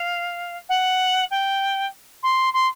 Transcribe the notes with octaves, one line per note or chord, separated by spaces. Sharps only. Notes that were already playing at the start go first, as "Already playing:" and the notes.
Already playing: F5
F#5
G5
C6
C6